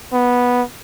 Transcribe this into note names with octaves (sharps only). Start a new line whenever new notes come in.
B3